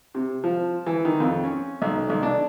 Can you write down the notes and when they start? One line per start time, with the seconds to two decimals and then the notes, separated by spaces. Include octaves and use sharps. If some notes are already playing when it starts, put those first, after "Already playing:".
0.15 C3
0.44 F3
0.86 E3
1.05 D#3
1.20 F2
1.44 C#4
1.82 B1
2.10 B1
2.23 D4